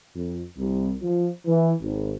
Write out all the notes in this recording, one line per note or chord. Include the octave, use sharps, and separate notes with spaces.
F2
C2
F3
E3
G#1